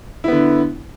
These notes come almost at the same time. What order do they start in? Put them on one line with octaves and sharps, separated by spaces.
E4 B3 D3